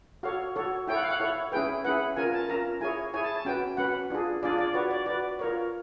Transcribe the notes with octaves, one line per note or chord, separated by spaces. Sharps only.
F#4 A4 C#5 F5
F#4 A4 C#5
E4 A4 C#5 G5
F#5
F5
F#5
E4 A4 C#5
C#4 E4 G#4 B4 G5
C#4 E4 G#4 B4 F#5
C#4 F4 A#4 G#5
A5
C#4 F4 A#4 A#5
E4 G#4 C#5 G#5
E4 G#4 C#5 G#5
A5
A5
C#4 F#4 B4 G5
C#4 F#4 B4 F#5
D4 F4 G#4
D4 F4 G#4 D5
D5
F#4 B4 C#5
D5
F#4 B4 D5
F4 A#4 C#5